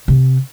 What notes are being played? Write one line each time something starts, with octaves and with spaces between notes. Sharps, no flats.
C3